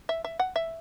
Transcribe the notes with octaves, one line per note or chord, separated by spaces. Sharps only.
E5
E5
F#5
E5